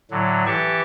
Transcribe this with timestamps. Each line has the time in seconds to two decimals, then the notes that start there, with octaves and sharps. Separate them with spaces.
0.11 A2 D3 F#3
0.46 E3 G4 A5 C#6